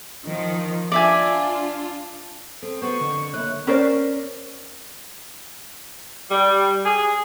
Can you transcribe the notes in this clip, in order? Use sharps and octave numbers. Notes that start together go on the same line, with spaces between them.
D#3 F3
D4 F4 D5 E5 G#5
C4 A4
B3 F#4 B4 C5 C#6
F2 D3
D#2 A3 A#3 C#5 F#6
C#4 A#4 C5 D5
G3
G#4